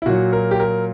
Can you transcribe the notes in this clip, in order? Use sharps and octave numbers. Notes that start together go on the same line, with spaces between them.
E4
A#2 F#3 F#4
A#4
G4
A#4